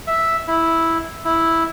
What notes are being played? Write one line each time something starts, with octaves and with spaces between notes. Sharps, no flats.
E5
E4
E4